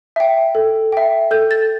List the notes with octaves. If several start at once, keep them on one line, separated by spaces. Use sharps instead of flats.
E5 G5
A4
E5 G5
A4 G6
A6